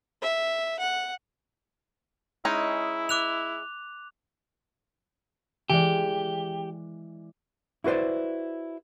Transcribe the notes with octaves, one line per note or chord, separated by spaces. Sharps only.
E5
F#5
G#3 C#4 D#4 E4
D6 F#6 F7
E3 G#3 G4 D5
E4 F#4 B4 C5 D5